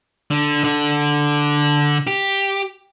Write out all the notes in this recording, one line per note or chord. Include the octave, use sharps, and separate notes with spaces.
D3
D3
G4